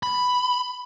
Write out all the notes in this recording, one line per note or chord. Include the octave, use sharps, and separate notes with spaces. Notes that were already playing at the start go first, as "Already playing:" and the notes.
B5